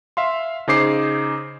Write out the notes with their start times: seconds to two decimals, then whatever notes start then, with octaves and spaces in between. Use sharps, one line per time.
0.17 E5 F5 C6
0.67 C#3 D#4 G#4 C5 D6 C7